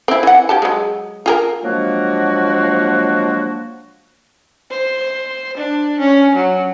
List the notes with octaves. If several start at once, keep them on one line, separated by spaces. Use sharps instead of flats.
C4 E4
E3 F#5
F#3 G4 A5
F#3 G#3
F4 G#4 A#4
F3 F#3 G#3 A#3 D4 F#4
C5
D4
C#4
F#3